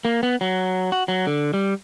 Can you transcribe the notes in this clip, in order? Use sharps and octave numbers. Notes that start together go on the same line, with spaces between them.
A#3
B3
F#3
F#4
F#3
D3
G3